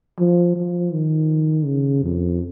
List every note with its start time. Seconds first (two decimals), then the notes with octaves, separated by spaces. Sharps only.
0.19 F3
0.56 F3
0.92 D#3
1.65 C#3
2.03 F2